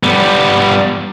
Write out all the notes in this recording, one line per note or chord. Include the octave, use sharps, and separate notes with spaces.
G3 B3